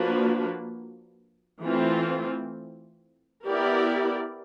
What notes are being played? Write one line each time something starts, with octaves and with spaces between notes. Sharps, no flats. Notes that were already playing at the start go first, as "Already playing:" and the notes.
Already playing: F3 A#3 D4 F#4 B4
E3 A3 C4 F4
B3 E4 G4 A#4 D5